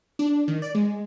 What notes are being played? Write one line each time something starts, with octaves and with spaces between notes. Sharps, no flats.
D4
D#3
D5
G#3